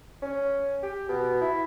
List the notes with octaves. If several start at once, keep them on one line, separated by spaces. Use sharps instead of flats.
C#4
G4
B2
E4